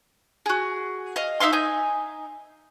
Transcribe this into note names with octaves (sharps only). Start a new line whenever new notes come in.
F#4 G#4
D#5 F5
D#4 E5 F5 C6
D#4 G#5 G6